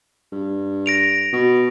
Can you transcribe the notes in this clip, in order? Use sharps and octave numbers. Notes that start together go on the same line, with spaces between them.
G2
A#6 D7 F7
B2